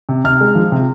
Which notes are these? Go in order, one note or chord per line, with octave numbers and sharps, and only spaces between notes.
C3
C3 F6
G#3
F3
C3